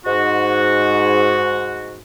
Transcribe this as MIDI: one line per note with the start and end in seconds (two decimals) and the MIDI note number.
0.06 1.99 44
0.06 1.99 66